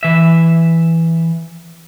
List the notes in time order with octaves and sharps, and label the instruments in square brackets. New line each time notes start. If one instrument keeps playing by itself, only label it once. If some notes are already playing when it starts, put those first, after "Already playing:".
[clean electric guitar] E3 E5